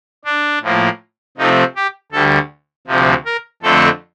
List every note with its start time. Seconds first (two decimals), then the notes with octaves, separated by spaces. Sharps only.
0.25 D4
0.62 A2 F3 A#3
1.37 C3 F3 A3 C4 D#4
1.76 G4
2.12 D2 D3 G3 A4
2.87 D2 C3 F3
3.25 A#4
3.62 F2 D3 A3 C4 A4